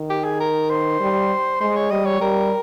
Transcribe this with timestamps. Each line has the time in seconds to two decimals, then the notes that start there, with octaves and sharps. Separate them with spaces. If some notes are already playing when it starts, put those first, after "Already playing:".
Already playing: D#3
0.10 G4
0.24 G#4
0.40 A#4
0.70 C5
1.00 G3
1.61 G#3 C5
1.76 C#5
1.91 G3 D#5
2.05 C#5
2.21 G3 A#4